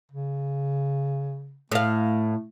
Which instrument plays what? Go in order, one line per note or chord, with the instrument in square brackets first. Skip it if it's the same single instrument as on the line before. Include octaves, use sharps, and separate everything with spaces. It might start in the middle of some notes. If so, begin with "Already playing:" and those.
[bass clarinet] C#3
[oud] A2 F5 [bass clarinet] A3